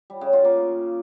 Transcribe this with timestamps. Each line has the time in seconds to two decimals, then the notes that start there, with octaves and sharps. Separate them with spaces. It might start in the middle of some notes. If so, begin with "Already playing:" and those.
0.10 G3
0.21 C#3
0.33 F4
0.45 A#3